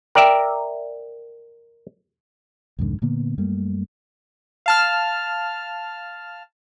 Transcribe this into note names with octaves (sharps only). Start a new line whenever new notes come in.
A#4 D5 E5 G5
C2 F2 G#2 D3
A#2 D3 A#3 B3
F#2 G3 A3 A#3
F5 A5 F6